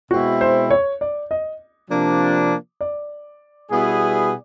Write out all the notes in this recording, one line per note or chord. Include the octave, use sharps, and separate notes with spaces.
B2 G#3 C4 E4 F#4
C5
C#5
D5
D#5
C3 F3 A#3 D4
D5
B2 G3 B3 E4 G#4